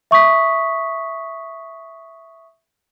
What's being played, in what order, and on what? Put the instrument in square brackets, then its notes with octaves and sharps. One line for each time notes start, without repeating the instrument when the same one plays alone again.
[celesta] E5 C#6 D#6 B6